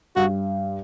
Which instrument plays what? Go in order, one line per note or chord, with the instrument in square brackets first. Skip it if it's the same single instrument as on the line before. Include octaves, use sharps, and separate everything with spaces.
[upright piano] G2 [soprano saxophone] F#4